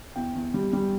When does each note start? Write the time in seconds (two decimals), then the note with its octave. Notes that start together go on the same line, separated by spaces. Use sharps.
0.16 E2 G5
0.35 E2
0.54 G3
0.73 G3